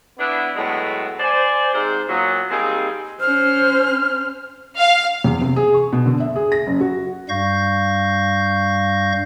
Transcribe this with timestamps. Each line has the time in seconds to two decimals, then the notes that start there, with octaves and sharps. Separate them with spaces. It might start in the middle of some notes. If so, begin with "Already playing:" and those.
0.19 B3 D4 E4
0.55 A2 F#3 G#3 B3
1.20 C5 D5 G#5
1.73 G#2 C3 C5
2.08 A#2 F#3 B3
2.51 G3 A#3 C4 D#4 G#4
3.20 C#4 C5 F6
4.78 F5
5.24 E2
5.41 C3
5.56 G#4
5.74 C#6
5.92 B2
6.06 D3
6.20 E5
6.36 G#4
6.52 A#6
6.67 F#1
6.81 F#4
7.29 G2 G3 F5 C#6 G6 A#6